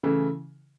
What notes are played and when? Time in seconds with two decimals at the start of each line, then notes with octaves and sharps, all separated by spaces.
0.03 C#3 E3 A3 E4